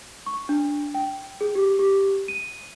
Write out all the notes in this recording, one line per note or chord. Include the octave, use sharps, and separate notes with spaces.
C#6
D4
G5
G#4
G4
G4
D#7